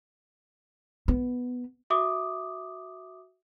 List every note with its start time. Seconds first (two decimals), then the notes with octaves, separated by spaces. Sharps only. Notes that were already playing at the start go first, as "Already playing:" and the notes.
1.08 B3
1.90 F#4 E5 D6 D#6